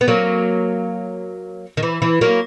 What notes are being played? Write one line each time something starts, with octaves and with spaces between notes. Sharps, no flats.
B3
F#3 A#3
D#3
E3
E3
F#3 A#3